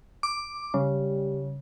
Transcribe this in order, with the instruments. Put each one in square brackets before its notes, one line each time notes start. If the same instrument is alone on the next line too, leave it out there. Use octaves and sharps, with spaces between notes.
[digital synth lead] D6
[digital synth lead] C#3 [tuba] G3